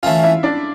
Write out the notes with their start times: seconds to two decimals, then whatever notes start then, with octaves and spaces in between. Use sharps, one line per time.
0.03 E3 A3 C#4 F4 F5
0.19 F5
0.24 E4 E5
0.43 D4 D5